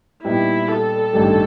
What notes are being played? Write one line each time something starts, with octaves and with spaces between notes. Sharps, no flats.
A#2 G3 B3 D#4 E4
A4
A1 G2 D#3 G3